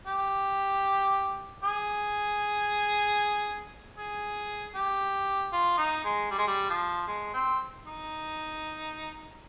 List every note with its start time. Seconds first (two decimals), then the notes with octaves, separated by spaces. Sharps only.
0.07 G4
1.63 G#4
3.97 G#4
4.75 G4
5.53 F4
5.77 D#4
6.04 G#3
6.30 G3
6.38 G#3
6.47 G3
6.69 F3
7.07 G#3
7.33 C4
7.86 D#4